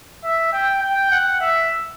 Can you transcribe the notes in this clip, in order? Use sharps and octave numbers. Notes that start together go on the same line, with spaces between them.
E5
G5
G5
F#5
E5